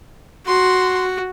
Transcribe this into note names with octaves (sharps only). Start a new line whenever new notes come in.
F#4 C6